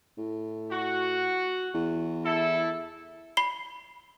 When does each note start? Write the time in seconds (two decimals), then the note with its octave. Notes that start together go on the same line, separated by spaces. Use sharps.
0.18 A2
0.71 F#4
1.74 E2
2.24 E4 A4
3.37 B5 C7 G7